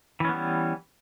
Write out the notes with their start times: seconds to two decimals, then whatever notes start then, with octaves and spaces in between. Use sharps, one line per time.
0.20 E3
0.25 C#4
0.29 B3
0.33 G3